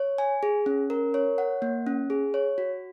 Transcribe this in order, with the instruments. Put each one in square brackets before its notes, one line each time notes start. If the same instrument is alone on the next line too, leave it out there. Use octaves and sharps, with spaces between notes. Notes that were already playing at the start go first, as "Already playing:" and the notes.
Already playing: [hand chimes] C#5
G#5
G#4
C#4
A#4
C#5
F#5
A#3
C#4
G#4
C#5
F#4